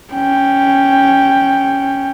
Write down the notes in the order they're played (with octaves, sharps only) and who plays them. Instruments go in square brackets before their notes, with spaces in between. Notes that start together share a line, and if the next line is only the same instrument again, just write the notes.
[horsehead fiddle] C#4 G5